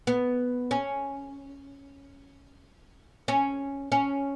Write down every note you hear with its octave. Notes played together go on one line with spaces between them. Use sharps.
B3
C#4
C#4
C#4